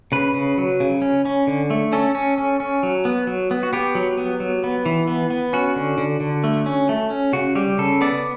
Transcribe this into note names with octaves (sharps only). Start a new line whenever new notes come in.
C#3 B4
C#3
F#3
C#3
C#4
C#4
D3
A3
C#4 A4
C#4
C#4
C#4
F#3
B3
F#3
B3
F#4
B3 G4
F#3
B3
F#3
B3
E3
B3
B3
C#4 F#4
D3
D3
D3
A3
C#4
A3
C#4
C#3 F#4
G3 G4
C#3 A4
B3 D5